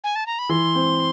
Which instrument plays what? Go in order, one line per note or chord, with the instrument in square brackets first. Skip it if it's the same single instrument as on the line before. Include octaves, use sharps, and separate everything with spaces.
[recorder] G#5
A5
A#5
B5
[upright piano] E3 [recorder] C6
[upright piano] C4